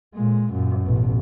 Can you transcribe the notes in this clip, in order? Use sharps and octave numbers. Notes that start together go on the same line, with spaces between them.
A#2 G#3
F#2 A#2
A1 B2